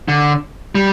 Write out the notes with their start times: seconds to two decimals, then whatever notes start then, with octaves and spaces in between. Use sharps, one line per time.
0.08 D3
0.75 G3